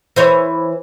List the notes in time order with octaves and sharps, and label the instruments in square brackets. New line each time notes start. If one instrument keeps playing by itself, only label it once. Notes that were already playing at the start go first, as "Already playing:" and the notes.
[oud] E3 C5 C#5